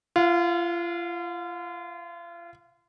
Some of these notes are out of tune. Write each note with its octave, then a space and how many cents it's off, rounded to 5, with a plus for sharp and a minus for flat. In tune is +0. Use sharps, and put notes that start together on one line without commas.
F4 -35 F5 +35